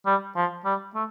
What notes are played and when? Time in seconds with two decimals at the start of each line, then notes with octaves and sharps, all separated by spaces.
0.06 G3
0.36 F3
0.65 G3
0.95 A3